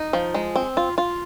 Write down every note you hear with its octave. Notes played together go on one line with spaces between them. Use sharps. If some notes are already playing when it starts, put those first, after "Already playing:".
Already playing: D#4
F3
G#3
C4
F4
F4